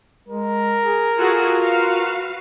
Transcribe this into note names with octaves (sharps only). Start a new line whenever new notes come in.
G#3 A#4
G#4
F4 F#4 G#4 A4
F#4 B4 F5